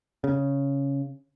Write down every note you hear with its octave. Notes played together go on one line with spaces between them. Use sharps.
C#3